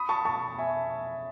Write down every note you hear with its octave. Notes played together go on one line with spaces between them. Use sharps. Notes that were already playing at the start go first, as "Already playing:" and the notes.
Already playing: B5 D#6
A5 C#6
A5 C#6
E5 G#5